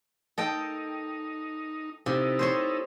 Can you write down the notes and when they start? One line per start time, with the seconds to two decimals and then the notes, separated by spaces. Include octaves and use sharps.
0.38 D#4 A4 D#5 G5
2.06 C3 D#4 E4 A4
2.39 C5 C#5 C6